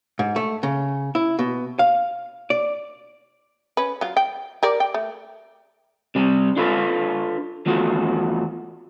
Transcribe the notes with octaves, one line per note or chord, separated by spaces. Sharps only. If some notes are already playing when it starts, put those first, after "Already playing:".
G#2
A3
C#3
E4
B2
F5
D5
C#4 B4
F#3 F4
G5
G4 A#4 D5
G5
A3
C3 G3
D4 F4 A4 B4
E2 F3 A3 F#4